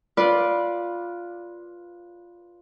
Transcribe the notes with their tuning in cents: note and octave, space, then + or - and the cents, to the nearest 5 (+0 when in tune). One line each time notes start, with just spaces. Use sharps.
F4 +0 B4 -15 D5 +0